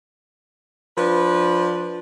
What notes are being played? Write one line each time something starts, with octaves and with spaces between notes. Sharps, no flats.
F3 D4 B4